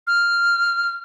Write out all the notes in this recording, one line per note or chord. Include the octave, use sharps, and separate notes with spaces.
F6